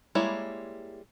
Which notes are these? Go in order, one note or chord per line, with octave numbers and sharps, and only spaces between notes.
G3 G#3 A#3 E4 C#5